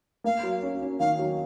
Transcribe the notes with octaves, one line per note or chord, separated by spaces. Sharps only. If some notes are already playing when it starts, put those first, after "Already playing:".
A#3 F5
F#3
C#4
C#4
D#3 F5
F#3